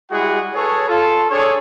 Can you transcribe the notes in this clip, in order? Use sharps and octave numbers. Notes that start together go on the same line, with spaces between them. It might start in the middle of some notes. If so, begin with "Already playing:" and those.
G3 G#3 E4 F#4 G#4 F#5
G#4 A4 B4 C#5
F4 A4
D4 G#4 A4 C#5